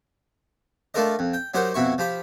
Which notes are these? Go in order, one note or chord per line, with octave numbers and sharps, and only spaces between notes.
A3 D4 F4 A4 A#4 D#5
F2
G5
F#3 D#4 G4 A#4 C5 F#5
F2 B2 E4 C#6
F3 G4 B5